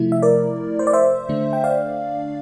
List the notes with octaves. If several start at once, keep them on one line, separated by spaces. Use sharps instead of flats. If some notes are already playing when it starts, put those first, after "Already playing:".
Already playing: C3 F3 A3 E4
E5
A#4 D5
C5
D5
C5 E5
D3 A3 D4
G5
D5 F5